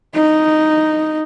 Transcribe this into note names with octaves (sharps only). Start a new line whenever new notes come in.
D#4